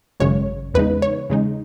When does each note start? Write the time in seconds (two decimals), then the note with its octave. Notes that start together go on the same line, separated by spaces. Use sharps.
0.20 G#1 F#2 C#3 G#3 C#5
0.74 E2 C#3 G#3 D#4 B4
1.02 C#5
1.30 E2 C#3 G#3 D#4